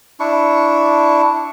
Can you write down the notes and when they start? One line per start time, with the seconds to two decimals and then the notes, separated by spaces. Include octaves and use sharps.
0.20 D4 E4 C#6